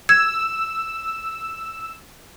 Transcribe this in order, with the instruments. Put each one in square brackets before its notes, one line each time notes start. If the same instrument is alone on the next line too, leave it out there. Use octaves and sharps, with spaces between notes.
[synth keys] E6 [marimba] G#6